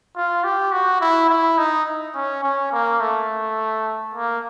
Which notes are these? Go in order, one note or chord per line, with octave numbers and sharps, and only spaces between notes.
F4
G4
F#4
E4
E4
D#4
C#4
C#4
A#3
A3
A#3